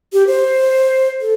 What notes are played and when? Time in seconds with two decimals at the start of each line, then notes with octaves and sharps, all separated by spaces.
0.13 G4
0.27 C5
1.21 A4